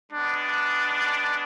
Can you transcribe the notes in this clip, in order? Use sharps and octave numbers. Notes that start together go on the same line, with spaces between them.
G#3 B3 D4